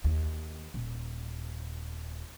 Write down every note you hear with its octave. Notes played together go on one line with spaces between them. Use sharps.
D#2
D#1